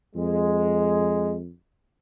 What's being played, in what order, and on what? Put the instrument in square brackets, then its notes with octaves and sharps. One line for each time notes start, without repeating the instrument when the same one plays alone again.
[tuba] F2 [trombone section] G#3